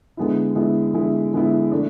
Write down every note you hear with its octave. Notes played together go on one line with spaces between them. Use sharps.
D3 G#3 B3 E4
D3 G#3 B3 E4
D3 G#3 B3 E4
D3 G#3 B3 E4
A3 D4